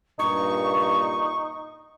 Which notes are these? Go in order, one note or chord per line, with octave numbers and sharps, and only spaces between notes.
G2 A#2 D#4 C#6